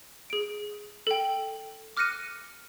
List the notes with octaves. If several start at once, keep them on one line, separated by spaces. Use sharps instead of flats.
G#4 D7
A4 G5
D6 F6 F#6 A#6 C#7 D#7